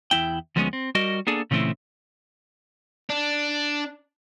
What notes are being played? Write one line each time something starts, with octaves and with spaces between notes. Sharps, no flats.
E2 E4 G5
D2 F3 G3 G#3 B3 C#4
C4
G3 F#4 A#4 D#5
A#3 B3 D4 G#4 A4
A#2 C#3 E3 A3 C4 E4
D4